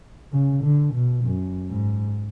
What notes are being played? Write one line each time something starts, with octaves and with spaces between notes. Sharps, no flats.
C#3
D3
B2
F#2
G#2